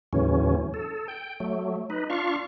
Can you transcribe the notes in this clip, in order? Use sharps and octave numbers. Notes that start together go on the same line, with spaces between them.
D#2 A2 C#3 E3 F#3 C#4
A4
G5
F#3 A3
D#4 B4
D4 F4 F5 C#6